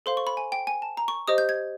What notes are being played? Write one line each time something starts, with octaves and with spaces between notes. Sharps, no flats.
A4 C5 F5 C6
C#6
B5
G#5
G5
G#5
A5
A#5
C#6
G4 C5 D#5 D#6
G6
G#6